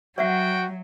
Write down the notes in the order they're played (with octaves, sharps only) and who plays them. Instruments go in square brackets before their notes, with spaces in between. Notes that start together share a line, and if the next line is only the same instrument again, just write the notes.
[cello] F#3 [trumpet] F#4 [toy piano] D5 E5 F#5 [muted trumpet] G5